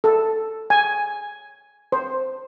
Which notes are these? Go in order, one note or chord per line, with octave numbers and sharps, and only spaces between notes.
A4
G#5
C5